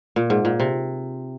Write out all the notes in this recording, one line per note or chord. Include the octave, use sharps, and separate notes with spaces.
A#2
G#2
A#2
C3